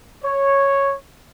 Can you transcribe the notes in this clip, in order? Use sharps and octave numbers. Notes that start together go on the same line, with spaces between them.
C#5